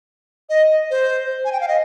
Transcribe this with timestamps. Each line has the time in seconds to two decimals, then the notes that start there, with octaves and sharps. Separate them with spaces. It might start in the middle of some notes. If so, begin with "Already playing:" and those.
0.50 D#5
0.91 C5
1.45 G#5
1.52 G5
1.61 F5
1.68 D#5